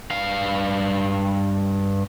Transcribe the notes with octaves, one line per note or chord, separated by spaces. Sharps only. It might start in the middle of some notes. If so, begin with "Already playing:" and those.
G2 F5